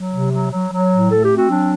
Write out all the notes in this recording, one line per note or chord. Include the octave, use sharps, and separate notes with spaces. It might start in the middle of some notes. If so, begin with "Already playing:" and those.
Already playing: F#3
C3
F#3
F#3
F#3
A2
A3 A4
G4
C4
F#4
F#3 D4